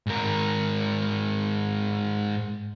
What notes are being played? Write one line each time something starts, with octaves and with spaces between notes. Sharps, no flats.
G#2 A#4